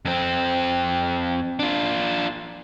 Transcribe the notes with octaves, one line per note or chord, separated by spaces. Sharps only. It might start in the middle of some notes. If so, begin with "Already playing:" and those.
F2 C4
D4 F4